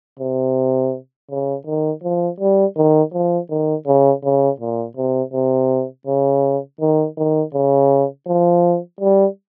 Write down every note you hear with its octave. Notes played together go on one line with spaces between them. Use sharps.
C3
C#3
D#3
F3
G3
D#3
F3
D#3
C#3
C#3
A#2
C3
C3
C#3
D#3
D#3
C#3
F3
G3